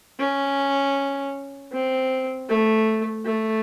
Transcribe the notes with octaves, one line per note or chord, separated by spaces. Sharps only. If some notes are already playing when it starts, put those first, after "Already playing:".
C#4
C4
A3
A3